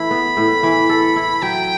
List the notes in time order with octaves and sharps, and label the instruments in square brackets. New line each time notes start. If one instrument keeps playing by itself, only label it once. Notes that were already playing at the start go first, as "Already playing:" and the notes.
Already playing: [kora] E3 A3 E4 [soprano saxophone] B5
[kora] B3
A2
E3
A4
E4
[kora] F#3 [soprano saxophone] G5